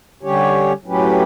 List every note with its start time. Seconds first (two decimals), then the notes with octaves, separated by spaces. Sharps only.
0.23 D3 G3 C#4 G4 C#5
0.85 A2 F#3 C#4 G4 B4